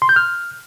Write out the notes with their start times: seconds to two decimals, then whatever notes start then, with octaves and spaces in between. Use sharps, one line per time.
0.02 C6
0.09 G6
0.16 F6